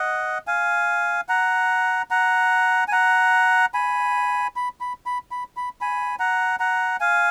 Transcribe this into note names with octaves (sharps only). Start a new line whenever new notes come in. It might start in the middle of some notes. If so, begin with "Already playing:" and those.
Already playing: D#5 F#5
F5 G#5
F#5 A#5
F#5 A#5
G#5
F#5 A#5
G#5 B5
B5
B5
B5
B5
B5
G#5 B5
F#5 A#5
F#5 A#5
F5 G#5